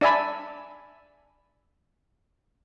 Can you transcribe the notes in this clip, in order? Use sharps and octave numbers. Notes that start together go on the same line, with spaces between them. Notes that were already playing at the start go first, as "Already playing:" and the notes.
D4 D5 E5 G#5 B5